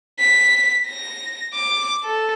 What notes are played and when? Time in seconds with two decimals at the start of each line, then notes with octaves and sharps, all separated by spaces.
0.20 B6
0.86 A#6
1.54 D6
2.03 A4